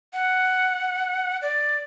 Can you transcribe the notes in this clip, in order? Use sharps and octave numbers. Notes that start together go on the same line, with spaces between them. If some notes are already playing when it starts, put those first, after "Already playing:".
F#5
D5